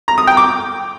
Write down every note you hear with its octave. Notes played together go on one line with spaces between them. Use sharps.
A#5
D#6
G5
D6